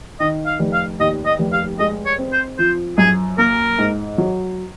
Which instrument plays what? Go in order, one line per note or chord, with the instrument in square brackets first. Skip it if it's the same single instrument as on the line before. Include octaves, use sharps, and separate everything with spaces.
[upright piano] D#3 [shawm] D#5
[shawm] F5
[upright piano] F1
[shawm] F5
[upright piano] D#2 [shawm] D#5
[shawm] D#5
[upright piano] F1
[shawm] F5
[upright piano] G#3 [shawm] D#5
[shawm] C#5
[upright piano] C4
[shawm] C5
[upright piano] F3 [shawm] C5
[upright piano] F#2 [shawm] G#4
[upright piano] A#3 [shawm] A#4
[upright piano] G#2
F#3